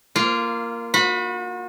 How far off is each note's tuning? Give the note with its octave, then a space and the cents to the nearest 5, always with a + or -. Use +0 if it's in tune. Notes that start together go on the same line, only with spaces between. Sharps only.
A#3 +0 F4 -20
F#4 -40 B5 +0